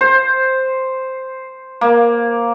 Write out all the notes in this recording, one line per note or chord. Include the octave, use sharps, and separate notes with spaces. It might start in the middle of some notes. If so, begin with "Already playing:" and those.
C5
A#3